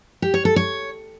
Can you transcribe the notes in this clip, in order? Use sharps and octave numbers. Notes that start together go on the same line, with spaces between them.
G4
C#5
A4
C#5